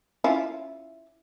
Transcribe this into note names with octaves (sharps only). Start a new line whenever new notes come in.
C#4 E4 F4